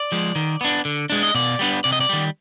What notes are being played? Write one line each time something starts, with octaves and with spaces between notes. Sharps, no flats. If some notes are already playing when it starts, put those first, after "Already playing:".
Already playing: D5
F3 G#3
D#3
B3 D4
D3
G#3 D4
D#5
B2 D5
G3 B3 D4
C3 D5
D#5
D5
D#3 G3